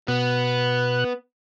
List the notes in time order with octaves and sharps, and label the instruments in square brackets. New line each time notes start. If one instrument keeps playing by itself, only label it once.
[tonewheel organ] B2 F#6 [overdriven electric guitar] B3